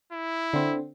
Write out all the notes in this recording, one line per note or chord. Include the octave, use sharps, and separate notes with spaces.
E4
D3 C4